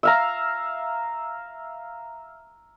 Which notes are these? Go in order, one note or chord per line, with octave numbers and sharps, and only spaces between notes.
E5 F5 A#5